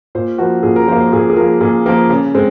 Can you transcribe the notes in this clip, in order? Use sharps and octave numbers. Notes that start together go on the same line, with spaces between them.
A#2 C5
F3 A#3 F#4
A#2 G#4
A#4
F3 A#3 C5
C5
A#2 G#4
G#4
F3 A#3 A#4
A#2 G#4
F3 A#3 A#4
C#3
G#3 C4